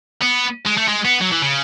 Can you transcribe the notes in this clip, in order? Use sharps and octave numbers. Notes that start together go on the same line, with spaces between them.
B3
G#3
A3
G#3
B3
F#3
E3
C#3